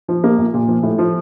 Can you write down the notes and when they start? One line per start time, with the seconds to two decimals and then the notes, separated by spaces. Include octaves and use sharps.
0.08 F3
0.24 A#3
0.38 A#1
0.54 A#2
0.68 F3
0.83 A2
0.98 F3